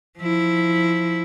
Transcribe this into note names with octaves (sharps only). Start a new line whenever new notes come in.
F3 E4